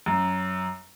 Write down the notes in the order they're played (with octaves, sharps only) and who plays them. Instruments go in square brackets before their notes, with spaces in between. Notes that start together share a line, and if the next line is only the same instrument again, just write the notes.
[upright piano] F#2